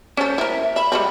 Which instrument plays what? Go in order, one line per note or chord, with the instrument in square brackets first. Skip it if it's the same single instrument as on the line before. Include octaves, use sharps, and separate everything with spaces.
[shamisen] C#4 A4 [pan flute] C5
[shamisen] E4 A#4 [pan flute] E5
[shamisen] E5 [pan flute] B5
[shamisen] G3 G#3 C4